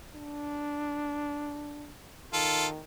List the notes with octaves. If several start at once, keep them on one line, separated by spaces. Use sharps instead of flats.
D4
D#3 F4 A4